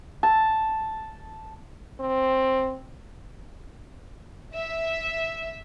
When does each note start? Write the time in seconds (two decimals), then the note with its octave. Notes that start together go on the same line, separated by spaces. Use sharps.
0.23 A5
2.00 C4
4.54 E5